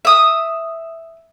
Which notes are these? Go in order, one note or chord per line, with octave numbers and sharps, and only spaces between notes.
E5 D#6